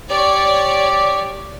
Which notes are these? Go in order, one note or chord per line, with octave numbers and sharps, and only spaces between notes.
G4 C#5 D5